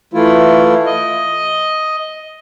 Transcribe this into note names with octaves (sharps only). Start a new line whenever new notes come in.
E3 A3 E4 F4
D#5